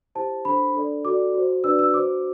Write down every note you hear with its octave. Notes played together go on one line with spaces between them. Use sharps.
E4 G4 C5 A5
D4 A4 C5 B5
D4 A4 D5
F#4 A4 D5 D6
F#4 C5
D4 F#4 B4 D5 E6
E6
F#4 C5 D6